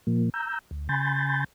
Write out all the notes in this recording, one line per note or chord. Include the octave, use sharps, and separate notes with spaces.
A#2 F3 A#3
A#5 E6 G6
D2
C#3 G#5 B5 C6 G6 A6